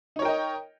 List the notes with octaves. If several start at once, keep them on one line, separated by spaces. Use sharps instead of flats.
D#4 A#4 C#5 D#5 G5